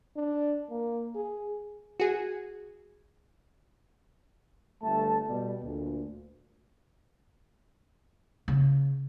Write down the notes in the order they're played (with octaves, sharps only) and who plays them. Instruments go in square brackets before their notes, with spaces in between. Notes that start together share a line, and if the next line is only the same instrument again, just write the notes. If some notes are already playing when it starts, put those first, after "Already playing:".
[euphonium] D4
A#3
G#4
[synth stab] F#4 G#4
[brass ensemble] G1 A3 A5
B2 G3
D2 A#2
[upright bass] C#3